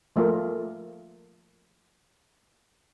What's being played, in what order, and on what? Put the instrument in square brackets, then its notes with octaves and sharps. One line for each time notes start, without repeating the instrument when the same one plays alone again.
[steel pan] F3 A3 A#3 F4 A#4